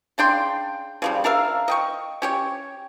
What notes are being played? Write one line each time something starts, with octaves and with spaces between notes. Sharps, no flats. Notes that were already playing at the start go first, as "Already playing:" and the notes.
C#3 D4 G5 C6
C#3 F3 G3
D4 A#4 E5 F5
D#5 G5 C#6
C#4 G4 C#5